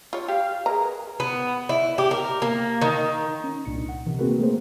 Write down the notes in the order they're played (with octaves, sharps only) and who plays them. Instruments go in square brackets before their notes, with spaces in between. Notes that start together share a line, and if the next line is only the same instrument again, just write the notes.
[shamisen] F4 C#5
[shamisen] G4 [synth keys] F5
[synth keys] G#4 A#4 B4 [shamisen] A#5
[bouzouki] B3
E4
G4
A#4
A#3
D#3
[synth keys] C#4
C2 A#2 D4 D#4 C#7
F#5
C3 D#3 E3
A#3 C4 F#4 G#4 A#4 B4
A3 A#3 C4 G#4 A#4 C5